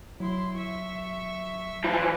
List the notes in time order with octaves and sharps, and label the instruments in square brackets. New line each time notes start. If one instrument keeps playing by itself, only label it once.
[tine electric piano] F#3 [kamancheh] E4 C6
[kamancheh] E5 C#6
[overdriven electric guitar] E3 F3 [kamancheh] A5 F#6